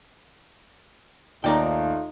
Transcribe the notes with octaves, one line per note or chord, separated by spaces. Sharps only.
D#2 A3 D#4 F4 A#4 D5 G5